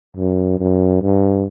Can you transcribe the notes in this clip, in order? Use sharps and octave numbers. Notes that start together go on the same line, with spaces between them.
F#2
F#2
G2